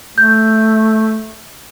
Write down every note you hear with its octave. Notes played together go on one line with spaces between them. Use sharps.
A3 G6